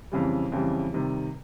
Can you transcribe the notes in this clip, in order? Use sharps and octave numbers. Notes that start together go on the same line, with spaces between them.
F2 C#3 E3 G3
F2 C#3 E3 G3
C3 D#3 G3